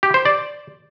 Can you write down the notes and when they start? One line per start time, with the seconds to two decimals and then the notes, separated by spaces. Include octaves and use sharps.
0.03 G4
0.14 C5
0.25 D5